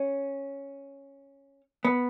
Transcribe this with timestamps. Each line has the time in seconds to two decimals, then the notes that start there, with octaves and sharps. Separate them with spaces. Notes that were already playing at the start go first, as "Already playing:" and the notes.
Already playing: C#4
1.85 B3